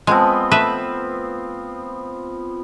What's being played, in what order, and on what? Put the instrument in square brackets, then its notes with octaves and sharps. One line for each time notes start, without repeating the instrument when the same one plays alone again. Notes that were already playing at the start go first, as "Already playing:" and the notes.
[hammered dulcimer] F3 B3 C4 [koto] G#3
[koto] A3 B4 E5